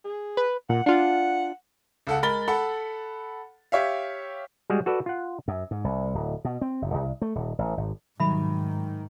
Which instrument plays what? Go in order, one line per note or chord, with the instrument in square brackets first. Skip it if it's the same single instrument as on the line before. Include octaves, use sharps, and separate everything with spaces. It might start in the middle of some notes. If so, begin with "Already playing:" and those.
[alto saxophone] G#4
[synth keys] B4
[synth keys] A#2 [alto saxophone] F#5
[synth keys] D4 F4 [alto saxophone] F#5
[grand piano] C#2 A4 F#5
G#3 A#4 B5 A6 G7
A4 F#5 B5
G4 C#5 E5 F5
[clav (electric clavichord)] G3 G#3 F#4 G#4
F#4 A4 B4 D5
F4 F#5
[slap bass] F#2
G#2
C2
D1
B2
C4
F#1
C2
A3
D#1
A1
G#1
[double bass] G#2 [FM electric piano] B2 F#3 G3 [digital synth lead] D#3 [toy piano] E5 B5